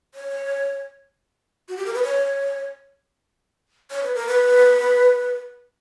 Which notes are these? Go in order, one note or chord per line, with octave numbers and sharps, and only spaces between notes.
C#5
F#4
G4
A#4
B4
C#5
C#5
B4
A#4
B4